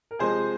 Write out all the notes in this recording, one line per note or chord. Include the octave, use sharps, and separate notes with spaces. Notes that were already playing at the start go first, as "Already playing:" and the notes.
A#4
C3 F3 G#3 G#4 C5